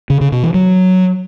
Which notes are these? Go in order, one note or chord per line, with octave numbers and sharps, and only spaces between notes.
C#3
C#3
B2
E3
F#3